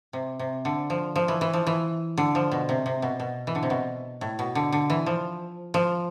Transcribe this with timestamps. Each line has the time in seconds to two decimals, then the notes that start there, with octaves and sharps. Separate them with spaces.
0.13 C3
0.39 C3
0.65 D3
0.90 F3
1.16 F3
1.28 E3
1.41 E3
1.53 F3
1.67 E3
2.18 D3
2.35 F3
2.52 B2
2.69 C3
2.86 C3
3.02 B2
3.20 B2
3.47 E3
3.55 D3
3.63 C3
3.70 B2
4.21 A2
4.39 B2
4.55 D3
4.72 D3
4.90 E3
5.06 F3
5.74 F3